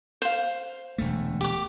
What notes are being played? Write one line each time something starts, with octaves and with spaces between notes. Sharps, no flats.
C5 F5
E1 D2 A3
G4 D6